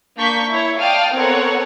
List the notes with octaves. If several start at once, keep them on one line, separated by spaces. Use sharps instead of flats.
A#3 D4 C#6 G6 B6
E4 C#5
D5 F5 G5 A5 D#6 F6
B3 C4 A4 A#4 C#5 F#5